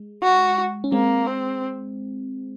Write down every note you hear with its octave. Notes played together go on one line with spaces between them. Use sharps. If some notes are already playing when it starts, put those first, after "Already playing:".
Already playing: G#3
F#4
C#4
G#3 A#3 C4
C4